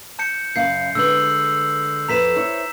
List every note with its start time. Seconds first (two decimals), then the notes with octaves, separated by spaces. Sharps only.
0.19 A5 G6 C#7
0.56 F#2 C#3 F5 G6 C7
0.95 D3 G#3 B4 E6 G6 F#7
2.08 F2 A4 B4 A#5 B6 E7
2.36 E4 C5 C#5